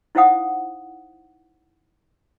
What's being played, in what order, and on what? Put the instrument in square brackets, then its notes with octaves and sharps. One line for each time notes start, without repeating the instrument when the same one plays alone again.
[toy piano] D#4 E4 C5 F5 F#5 D#6